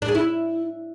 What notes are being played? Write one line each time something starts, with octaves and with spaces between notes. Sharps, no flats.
D4
G#4
E4